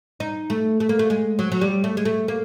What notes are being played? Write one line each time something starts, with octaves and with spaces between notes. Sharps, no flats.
D#4
A3
A3
A#3
A3
G#3
F#3
F#3
G3
A3
G#3
A3
A#3